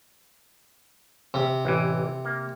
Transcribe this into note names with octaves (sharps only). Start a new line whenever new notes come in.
C3
A1 E3
A#3